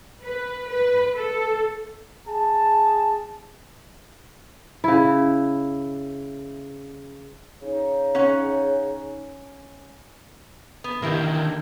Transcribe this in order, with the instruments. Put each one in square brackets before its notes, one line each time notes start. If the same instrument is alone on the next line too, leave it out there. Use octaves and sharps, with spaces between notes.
[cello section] B4
B4
A4
[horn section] G#4 A5
[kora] C#3 E4
[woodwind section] C#3 D#4
[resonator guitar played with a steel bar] C#4 F#5
B3
[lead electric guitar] D3 D#3 [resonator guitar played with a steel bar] A#3 E4 G4